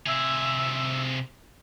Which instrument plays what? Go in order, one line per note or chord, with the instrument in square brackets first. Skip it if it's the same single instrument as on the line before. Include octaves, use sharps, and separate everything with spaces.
[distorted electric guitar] C3 G#4 [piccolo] E5